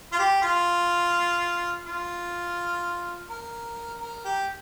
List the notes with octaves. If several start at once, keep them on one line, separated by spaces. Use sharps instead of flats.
F4
G4
F4
F4
A#4
A#4
G4